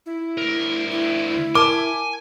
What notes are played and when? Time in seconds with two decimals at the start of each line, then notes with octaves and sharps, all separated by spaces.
0.06 E4
0.38 D2 A#4
0.91 E4
1.55 A#4 G#5 A5 D6